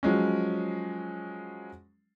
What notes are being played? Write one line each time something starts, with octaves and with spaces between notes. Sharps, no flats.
F3 F#3 G#3 C#4